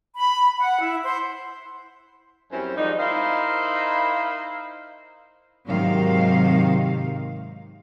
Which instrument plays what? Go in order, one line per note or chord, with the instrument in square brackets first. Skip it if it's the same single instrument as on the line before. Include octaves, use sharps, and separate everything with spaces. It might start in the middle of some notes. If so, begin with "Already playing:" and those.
[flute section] B5
F#5
E4
C5
[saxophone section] F#2 G3 C4 C#4 E4 C5
D#3 F3 G3 G#3 D#4
D#4 E4 A#4 C5 F5
[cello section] G#2 C3 D#3 F#3 F5